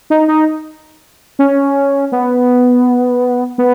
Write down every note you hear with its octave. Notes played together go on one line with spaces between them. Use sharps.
D#4
D#4
C#4
B3
B3